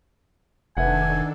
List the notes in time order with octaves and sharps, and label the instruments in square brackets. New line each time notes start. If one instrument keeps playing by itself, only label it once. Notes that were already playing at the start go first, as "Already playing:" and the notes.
[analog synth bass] F1 [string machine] D#3 D4 A4 [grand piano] B4 E5 F#5 [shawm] G#5